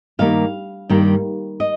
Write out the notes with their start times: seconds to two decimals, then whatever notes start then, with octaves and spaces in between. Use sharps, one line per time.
0.19 G2 D#3 G3 A#3 F5
0.89 G2 D#3 G3 A#3
1.60 D#5